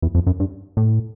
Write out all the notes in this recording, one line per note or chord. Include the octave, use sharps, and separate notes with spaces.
E2
F2
F#2
G2
A2